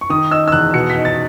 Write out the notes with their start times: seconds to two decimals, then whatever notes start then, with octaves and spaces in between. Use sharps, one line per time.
0.01 C#6
0.09 D#3 D#6
0.31 D#4 E6
0.48 E6
0.52 E2 F#6
0.74 B2 C#7
0.90 B6
0.96 D#4
1.05 A6